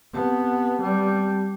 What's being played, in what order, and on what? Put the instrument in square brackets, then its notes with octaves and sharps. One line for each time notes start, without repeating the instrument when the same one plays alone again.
[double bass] B3 [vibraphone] C4 G4 A5
[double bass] G3